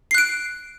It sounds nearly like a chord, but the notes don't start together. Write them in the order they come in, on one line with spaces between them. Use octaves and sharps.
C7 F#6 D7